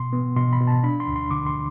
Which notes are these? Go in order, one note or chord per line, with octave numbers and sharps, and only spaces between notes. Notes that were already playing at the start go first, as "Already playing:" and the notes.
Already playing: B2 C6
B3
B2 C6
B5
B2
A5
D4 B5
C6
D2
C6
D3 D6
C6